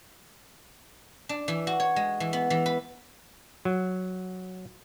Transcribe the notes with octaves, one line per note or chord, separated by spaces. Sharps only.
D4
E3
F#4
C#5
G#3
E3
B3
E3
B4
F#3